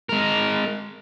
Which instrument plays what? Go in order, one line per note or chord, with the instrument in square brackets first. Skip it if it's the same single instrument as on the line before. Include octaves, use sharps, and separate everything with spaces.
[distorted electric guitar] G#3 A#4